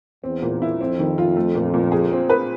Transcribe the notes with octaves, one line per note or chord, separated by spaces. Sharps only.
E2 C4
A#2
E4
F2 C4
D#3
F4
A3
A#2
A#2
G#4
C4
B4